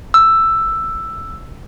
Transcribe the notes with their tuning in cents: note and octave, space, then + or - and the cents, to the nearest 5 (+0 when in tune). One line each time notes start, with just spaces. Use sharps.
E6 +5